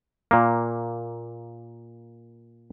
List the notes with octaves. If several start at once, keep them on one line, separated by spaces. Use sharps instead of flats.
A#2 A#3